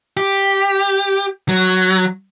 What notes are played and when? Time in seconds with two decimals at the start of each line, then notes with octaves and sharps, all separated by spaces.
0.17 G4
1.49 F#3